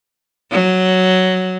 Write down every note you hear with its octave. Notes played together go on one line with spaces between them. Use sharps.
F#3